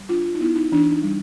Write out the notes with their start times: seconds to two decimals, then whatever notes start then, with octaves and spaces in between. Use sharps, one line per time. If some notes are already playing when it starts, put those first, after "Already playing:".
Already playing: G3
0.09 D4 F4
0.25 F4
0.35 D#4
0.40 B3 E4
0.56 D#4
0.72 E3 D4
0.92 D#4
1.03 G3